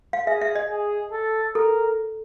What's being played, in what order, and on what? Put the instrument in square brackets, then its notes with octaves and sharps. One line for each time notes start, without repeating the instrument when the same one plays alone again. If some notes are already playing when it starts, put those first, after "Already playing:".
[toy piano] F5
[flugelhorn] G#4 [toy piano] E5
[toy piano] E5
D#5
[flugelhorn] G#4
A4
[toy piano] A4 [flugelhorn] A#4